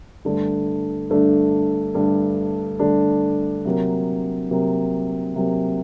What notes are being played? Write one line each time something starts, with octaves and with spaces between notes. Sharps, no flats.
G2 D3 A3 D4
G2 D3 A3 D4
G2 D3 A3 D4
G2 D3 A3 D4
C3 F#3 A#3
C3 F#3 A#3
C3 F#3 A#3